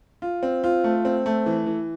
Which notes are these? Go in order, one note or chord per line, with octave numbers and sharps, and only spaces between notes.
F4
C4
F4
A3
C4
A3
E3
E3